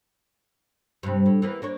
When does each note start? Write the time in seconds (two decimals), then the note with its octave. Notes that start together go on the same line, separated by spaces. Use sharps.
1.03 G2 C3
1.26 A2
1.42 E3 A#3 B3
1.62 A#3 D4 C#5